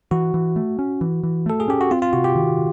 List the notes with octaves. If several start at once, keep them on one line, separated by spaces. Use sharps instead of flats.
E3 F#4
E3
A3
C#4
E3
E3
A3 A4
G#4
C#4 G4
F#4
C4 F4
F4
C3 F#4
G4
D#3